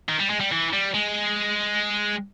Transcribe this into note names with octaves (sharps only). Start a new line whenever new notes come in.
D#3
G3
G#3
G3
E3
G3
G#3